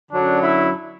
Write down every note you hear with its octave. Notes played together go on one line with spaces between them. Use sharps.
F#2 D3 F#3 D4
E4